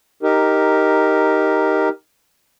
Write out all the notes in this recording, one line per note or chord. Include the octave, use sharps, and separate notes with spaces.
D#4 G4 A#4